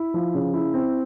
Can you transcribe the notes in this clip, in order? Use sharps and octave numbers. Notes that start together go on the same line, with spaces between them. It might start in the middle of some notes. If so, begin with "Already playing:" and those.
Already playing: E4
F3
C#3
E4
C4